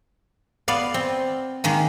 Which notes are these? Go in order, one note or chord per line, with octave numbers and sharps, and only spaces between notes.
B3 D5 F5
C4
D#3 G#3 A#3